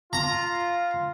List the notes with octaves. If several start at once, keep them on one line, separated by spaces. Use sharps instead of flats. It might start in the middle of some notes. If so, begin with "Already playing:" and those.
F4 A#5